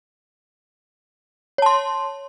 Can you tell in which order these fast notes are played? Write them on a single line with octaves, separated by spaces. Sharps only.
C#5 A5 C6